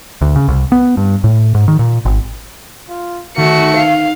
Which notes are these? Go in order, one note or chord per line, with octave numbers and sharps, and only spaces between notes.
D2
C#3
C2
B3
G2
A2
G#2
D#3
A#2
G#1
F4
D#3 A3 F#4 C#7
F5